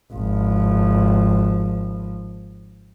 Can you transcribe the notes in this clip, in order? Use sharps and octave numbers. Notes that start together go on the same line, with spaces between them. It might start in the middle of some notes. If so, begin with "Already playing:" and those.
G#1 F3